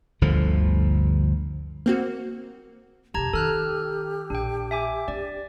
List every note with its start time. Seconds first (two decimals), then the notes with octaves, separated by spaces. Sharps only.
0.21 G1 D2 D3 F3
1.86 A#3 C4 F#4
3.14 F2 C3 G4 A5 A#5 G#6
3.33 D#3 A4 F6 F#6
4.30 A#1 D4 G5
4.71 E5 G#5 D6
5.08 D4 D5